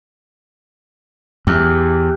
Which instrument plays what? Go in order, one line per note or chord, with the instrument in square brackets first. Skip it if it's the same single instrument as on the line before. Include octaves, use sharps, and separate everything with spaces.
[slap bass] E2 [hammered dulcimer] G4